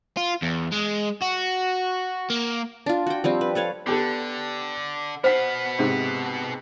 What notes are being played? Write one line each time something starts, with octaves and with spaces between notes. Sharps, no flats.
F4
E2
G#3
F#4
A#3
D4 F4
F#4 G5
F3 G3 C4
B4
A4 B4 C#5 F5
D3 B3 G4 A4
B2 B3 C5 F#5 F6 B6
G#2 C3